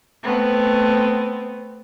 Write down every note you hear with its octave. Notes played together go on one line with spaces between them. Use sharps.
A3 B3 C4